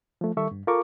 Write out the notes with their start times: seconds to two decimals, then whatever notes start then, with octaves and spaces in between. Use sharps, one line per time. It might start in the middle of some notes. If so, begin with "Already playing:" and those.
0.21 F3 A3
0.37 D#3 G3 A4 E5 C#6
0.51 G2
0.67 F4 A4 A#4 C#6 D6